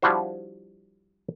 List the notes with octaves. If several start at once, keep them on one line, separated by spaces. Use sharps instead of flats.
F3 G3 D4 E4 F#4 C5